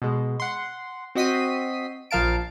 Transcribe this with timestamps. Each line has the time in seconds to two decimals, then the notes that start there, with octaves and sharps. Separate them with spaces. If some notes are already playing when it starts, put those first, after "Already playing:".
0.02 B2 G#3
0.40 F#5 C6
1.15 C4 F#4 D#5 B6 C7 D#7
2.11 A#1 F3 A#4 F5 A5 D7